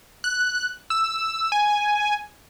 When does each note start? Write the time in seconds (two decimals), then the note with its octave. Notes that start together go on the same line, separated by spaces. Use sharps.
0.24 F#6
0.90 E6
1.52 G#5